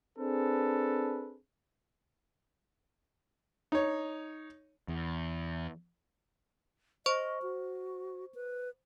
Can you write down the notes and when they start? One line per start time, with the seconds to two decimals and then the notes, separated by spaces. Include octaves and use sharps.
0.18 C4 D4 G#4 A4 B4
3.72 D#4 C#5
4.88 E2
7.06 C5 D#5 C#6
7.42 F#4
8.35 B4